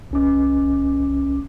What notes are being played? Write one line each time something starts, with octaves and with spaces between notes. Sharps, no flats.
C2 C#4 D6